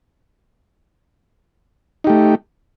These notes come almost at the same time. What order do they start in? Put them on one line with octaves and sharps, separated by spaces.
D#4 G4 A3